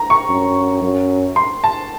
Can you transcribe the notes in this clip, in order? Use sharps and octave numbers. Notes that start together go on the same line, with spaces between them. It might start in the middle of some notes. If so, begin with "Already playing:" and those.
Already playing: A#5
C#6
F#2
F#2
C6
A5